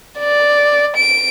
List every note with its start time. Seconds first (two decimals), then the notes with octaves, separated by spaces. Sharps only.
0.19 D5
0.96 D7